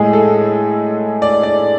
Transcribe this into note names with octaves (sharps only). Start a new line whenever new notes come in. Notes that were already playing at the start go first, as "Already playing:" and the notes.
Already playing: A2 G#3 G#4
A4
D5
D5